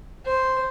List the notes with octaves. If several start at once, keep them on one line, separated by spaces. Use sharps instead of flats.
C5